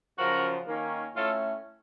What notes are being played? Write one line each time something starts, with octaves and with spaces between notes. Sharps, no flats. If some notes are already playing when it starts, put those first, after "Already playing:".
F#2 C#3 F3 F#4 A#4
D#3 A#3 C#4
A2 A3 C#4 F4 A4